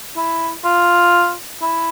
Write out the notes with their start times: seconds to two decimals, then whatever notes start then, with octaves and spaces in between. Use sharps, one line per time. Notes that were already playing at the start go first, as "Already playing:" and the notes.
0.17 E4
0.65 F4
1.62 E4